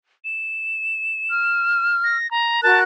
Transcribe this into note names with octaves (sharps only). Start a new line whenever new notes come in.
E7
F6
A#6
A#5
F#4 A#4 A5 F#6